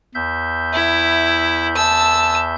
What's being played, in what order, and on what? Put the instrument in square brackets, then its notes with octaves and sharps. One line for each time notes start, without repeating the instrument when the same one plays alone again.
[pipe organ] E2 E5 G6
[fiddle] E4
A5 E6